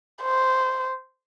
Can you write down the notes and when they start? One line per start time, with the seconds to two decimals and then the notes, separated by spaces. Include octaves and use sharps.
0.23 C5